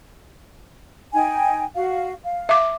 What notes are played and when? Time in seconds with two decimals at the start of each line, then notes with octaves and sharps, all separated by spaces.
1.13 D#4 G5 G#5
1.75 F#4 F5
2.24 F5
2.49 E5 D6